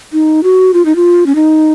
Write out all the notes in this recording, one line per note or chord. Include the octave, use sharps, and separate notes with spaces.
D#4
F#4
F4
D#4
F4
C#4
D#4